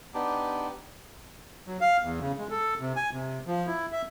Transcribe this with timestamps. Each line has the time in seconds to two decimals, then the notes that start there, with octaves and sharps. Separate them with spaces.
0.14 B3 D4 D#4 G4
1.67 F#3
1.81 F5
2.02 E2
2.20 C#3
2.39 G#3
2.50 A4
2.80 C3
2.96 G#5
3.13 C3
3.47 F3
3.67 E4
3.92 E5